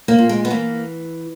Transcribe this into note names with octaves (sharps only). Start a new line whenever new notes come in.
A#3
A#2
G#3
B3
E3 A#3